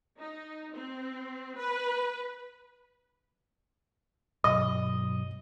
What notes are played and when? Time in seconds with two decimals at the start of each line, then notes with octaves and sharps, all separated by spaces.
0.19 D#4
0.73 C4
1.57 B4
4.44 G2 B2 F#3 D#5